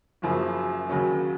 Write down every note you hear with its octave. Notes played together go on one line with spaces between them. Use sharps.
F#1 F#2 C#3 F3 A#3
D#2 C#3 F#3 A#3 C#4